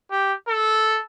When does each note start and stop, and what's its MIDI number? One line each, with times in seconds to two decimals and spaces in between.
0.11 0.34 67
0.48 1.01 69